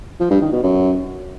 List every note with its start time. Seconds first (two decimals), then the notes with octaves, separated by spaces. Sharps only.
0.20 F3
0.31 G2
0.41 D#3
0.52 B2
0.63 F#2